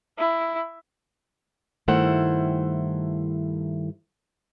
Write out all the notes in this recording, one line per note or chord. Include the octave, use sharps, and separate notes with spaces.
E4
G2 D#3 A3 E4 C5 F#5